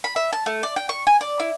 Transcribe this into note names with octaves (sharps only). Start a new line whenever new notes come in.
B5
E5
A5
A3
D5
G5
C#6
G#5
D5
E4